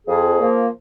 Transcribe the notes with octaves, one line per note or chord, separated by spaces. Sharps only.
F2 G#4
F3 A#3